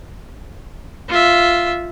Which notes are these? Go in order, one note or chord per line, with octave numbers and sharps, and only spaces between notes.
F4 E5